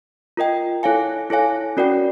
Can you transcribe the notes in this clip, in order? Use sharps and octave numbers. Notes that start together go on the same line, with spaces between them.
F4 A#4 D#5 G5
E4 A4 C#5 F5 G#5
E4 A4 C#5 F5 G#5
C#4 F#4 A#4 D5 G5